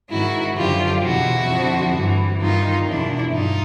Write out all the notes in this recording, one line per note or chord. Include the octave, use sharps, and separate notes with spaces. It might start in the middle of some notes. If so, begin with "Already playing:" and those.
G#2 D#3 E4 F#4
F#2 D3 F3 F4 G4
E2 B2 E4 F#4
F2 D3 F3
G2 E3
G2 D#3 D#4 F4
E2 B2 D4 E4
G2 D#4 F4